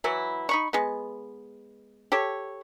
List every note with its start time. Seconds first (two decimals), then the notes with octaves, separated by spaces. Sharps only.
0.04 E3 F#3 E4
0.49 D#4 B5 C#6
0.73 G#3 B3
2.12 G4 A4 C#5